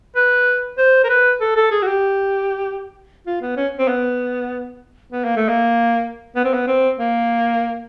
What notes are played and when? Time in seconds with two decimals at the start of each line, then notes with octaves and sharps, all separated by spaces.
0.16 B4
0.78 C5
1.04 A#4
1.09 B4
1.41 A4
1.57 A4
1.71 G#4
1.82 F#4
1.87 G4
3.27 F4
3.42 B3
3.57 C#4
3.79 C4
3.88 B3
5.13 B3
5.24 A#3
5.37 A3
5.49 A#3
6.36 B3
6.45 C4
6.54 B3
6.67 C4
6.98 A#3